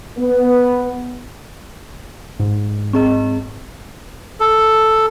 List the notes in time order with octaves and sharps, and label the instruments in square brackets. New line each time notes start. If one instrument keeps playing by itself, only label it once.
[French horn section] B3
[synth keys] G#2
[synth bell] C4 G#4 D#5
[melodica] A4